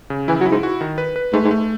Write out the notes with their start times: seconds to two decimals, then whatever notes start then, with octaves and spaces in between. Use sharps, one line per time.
0.10 C#3
0.28 E3 E4
0.40 F#3
0.46 E4
0.51 G#2
0.63 F#4
0.81 D#3
0.98 B4
1.16 B4
1.33 G#2 A3
1.44 G#2
1.51 A3